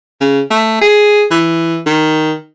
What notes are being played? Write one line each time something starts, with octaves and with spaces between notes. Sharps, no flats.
C#3
A3
G#4
E3
D#3